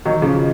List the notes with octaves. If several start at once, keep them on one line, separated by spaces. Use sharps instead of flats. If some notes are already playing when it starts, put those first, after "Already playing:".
D#3 F#3
C#3 F3